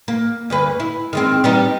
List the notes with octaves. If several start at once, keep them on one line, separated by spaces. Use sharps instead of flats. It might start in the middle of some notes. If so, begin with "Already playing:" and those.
A#3
D2 G2 B4
E4
D#3 G#3 C4
G3 B3 D#4